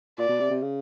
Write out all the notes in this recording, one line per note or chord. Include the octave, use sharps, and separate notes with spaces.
A#2 D5
B2
C3
C3
C#3